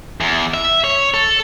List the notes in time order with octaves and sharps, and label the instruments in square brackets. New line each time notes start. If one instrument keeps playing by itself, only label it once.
[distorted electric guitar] E2
E5
C#5
A4